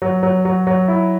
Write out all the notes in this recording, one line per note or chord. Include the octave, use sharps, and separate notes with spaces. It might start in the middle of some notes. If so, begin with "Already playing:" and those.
F#3
F#3
F#3
F#3
E4